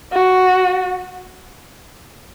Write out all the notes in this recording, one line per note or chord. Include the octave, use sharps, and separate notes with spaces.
F#4